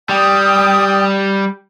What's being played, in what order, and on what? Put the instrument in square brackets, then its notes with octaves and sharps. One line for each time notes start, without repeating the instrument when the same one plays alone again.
[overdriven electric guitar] G3 [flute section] G5 D#6